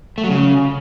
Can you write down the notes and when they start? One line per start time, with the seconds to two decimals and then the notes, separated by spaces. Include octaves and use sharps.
0.18 A3
0.24 F#3
0.29 C#3